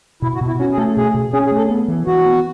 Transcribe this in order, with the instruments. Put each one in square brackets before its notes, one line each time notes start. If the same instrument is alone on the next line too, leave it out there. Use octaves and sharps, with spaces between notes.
[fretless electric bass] B2 [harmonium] E4
[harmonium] F#4
[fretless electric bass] B2
[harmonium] E4
[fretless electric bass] C#4 [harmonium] F#4
[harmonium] G#4
[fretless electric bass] A3 [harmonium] A4
[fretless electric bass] B2 [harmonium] G#4
[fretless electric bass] B2
[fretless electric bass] C#4 [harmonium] G#4
[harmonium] G#4
[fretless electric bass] A3
[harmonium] A4
[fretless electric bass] B3
E3
[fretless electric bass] E3 [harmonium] F#4
[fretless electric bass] B3